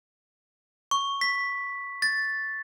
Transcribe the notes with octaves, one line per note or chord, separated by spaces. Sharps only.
C#6
B6
A6